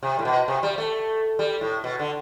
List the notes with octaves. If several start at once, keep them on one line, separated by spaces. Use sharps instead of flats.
C3
A2
B2
C3
G3
A3
G3
A2
B2
D3